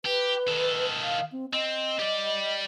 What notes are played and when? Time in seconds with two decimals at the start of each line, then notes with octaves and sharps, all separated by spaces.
0.05 G4 B4
0.48 D#3 A4
1.02 F5
1.32 C4
1.53 C4 D#5
1.99 G4 D5